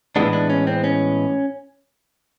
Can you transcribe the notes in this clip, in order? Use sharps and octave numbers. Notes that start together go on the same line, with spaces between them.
A2 E3 G#3 B3 D4
D4
C#4
C4
C#4